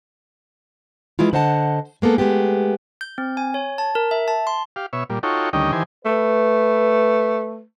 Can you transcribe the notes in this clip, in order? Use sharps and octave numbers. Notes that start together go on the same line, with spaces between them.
E3 G#3 E4 F4
D3 C5 D#5 F#5 A5
G#3 A#3 B3 A4
G#3 A3 B3 G4
G6
C4
G#5
C#5
A5
A#4
E5
A5
C6
G4 F5
B2 C#5 E5
A#2 G3
D#4 F4 F#4 A4 C#5 G5
D2 D#3 G3 C#4 D#5 G5
D#3 E3 G4 C5 G#5
A3 B4